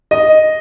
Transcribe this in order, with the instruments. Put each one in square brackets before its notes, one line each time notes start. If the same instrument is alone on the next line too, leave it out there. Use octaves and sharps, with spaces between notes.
[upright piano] D#5